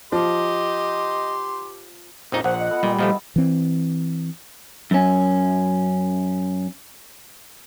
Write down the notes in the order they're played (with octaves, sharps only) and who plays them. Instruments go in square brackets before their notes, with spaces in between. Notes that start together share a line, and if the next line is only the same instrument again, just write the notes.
[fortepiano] F3 [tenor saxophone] G4 [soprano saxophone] D#5 [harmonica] C6
[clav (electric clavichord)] A#1 F2 D#4 [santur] F3 F4 [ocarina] C5
[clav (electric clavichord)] A#1 [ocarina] C5 [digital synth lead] F#5 [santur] C6 C#6
[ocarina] D#5
[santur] A3 B3 A4
[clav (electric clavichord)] A#2 [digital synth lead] G3 [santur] G#3 G4 E6
[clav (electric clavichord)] A#2 F3 A3 [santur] E4 [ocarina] D#5
[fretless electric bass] E3 C4
[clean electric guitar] F#2 C#4